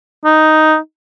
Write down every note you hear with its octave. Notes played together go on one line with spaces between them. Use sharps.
D#4